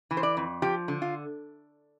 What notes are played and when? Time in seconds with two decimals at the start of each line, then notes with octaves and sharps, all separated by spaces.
0.11 E3
0.17 C5
0.23 D5
0.37 F2
0.62 F3 G4
0.88 D3
1.02 F4